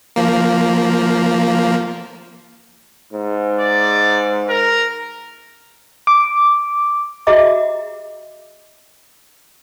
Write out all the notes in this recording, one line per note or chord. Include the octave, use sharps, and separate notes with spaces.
F3 A#3
G#2
D5
A#4
D6
F#4 G#4 D#5 E5 A#5 D6